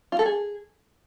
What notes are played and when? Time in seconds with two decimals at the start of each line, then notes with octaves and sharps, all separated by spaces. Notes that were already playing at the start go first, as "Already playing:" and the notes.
0.12 F4
0.19 A4
0.26 G#4